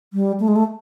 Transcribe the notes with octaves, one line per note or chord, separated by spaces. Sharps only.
G3
A3
G#3
A3